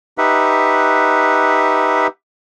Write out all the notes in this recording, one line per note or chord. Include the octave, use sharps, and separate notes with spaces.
D#4 G4 B4 E5 F#5